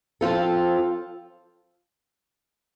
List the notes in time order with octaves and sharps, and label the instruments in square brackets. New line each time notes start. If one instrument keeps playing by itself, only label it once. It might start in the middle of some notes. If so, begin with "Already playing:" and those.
[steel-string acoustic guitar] F3 C4 F4 A4